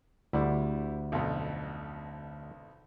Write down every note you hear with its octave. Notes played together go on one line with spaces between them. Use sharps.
D2 G3 E4
B1 F2